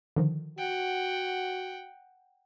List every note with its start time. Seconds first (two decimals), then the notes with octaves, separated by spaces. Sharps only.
0.16 D3 D#3 F3
0.58 F#4 F#5 G5